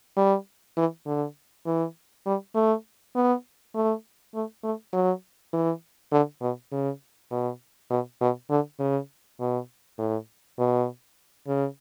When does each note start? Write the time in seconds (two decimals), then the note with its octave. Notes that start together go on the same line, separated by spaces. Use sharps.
0.17 G3
0.77 E3
1.07 D3
1.66 E3
2.26 G3
2.55 A3
3.15 B3
3.75 A3
4.34 A3
4.64 A3
4.93 F#3
5.53 E3
6.12 D3
6.42 B2
6.72 C#3
7.31 B2
7.91 B2
8.21 B2
8.50 D3
8.79 C#3
9.40 B2
9.99 A2
10.59 B2
11.48 C#3